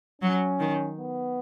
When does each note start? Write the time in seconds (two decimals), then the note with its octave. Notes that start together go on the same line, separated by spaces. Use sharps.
0.22 F#3 C#4
0.60 D#3
0.98 B3